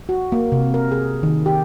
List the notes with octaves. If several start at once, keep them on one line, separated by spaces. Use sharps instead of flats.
F#4
A#3
C3
A#4
G#4
D#3
G4